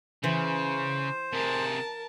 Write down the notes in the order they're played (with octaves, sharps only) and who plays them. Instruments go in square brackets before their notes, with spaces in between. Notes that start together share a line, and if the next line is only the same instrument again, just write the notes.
[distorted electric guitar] C#3 [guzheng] E3 [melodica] C5
[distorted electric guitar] C3 G#4 [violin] A#4 A5